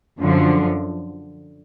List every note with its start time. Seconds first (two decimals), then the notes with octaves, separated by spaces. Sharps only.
0.19 F#2 D3 F3